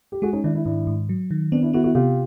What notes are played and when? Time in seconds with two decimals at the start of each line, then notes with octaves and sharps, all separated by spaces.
0.12 G4
0.22 G#3 F#4 G#4
0.33 C#4 D#4
0.44 D#3 D4 E4
0.54 D4 E4
0.65 G#2 D4 E4
0.87 G#2
1.09 F#3
1.31 D#3
1.52 B3 C4 D4
1.63 D4 E4
1.73 B3 E4 F#4
1.84 E4 F#4
1.95 C3 F4 G4